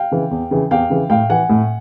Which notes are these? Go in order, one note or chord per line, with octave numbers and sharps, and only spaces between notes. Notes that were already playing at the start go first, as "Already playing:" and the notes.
Already playing: F5 G5
C#3 E3
E2
C#3 E3
E2 F5 G5
C#3 E3
A2 F5 G5
E3 F#5 G#5
A2